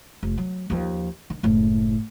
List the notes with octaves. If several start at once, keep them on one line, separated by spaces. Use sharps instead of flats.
F1
F#3
D#2 F3
D#3
F#1 A2